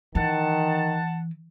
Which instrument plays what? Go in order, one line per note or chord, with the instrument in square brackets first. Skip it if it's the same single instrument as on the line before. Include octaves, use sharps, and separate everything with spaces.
[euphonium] D#3 [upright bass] E3 [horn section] F#5 A5